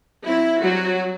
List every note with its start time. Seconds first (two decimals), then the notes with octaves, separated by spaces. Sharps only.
0.24 F#3 C4 E4
0.60 F#3 G3 C4 F#4